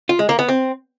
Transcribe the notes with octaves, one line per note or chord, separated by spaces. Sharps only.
F4
G#3
A#3
B3
C4